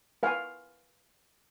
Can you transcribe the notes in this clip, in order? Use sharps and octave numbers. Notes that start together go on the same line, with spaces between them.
B4 F5 G#5